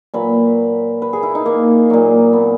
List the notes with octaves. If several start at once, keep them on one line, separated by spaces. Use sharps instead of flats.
A#2 F#3 B4
B4
G#4
E4
D#4
A#3
A#2 F#3
B3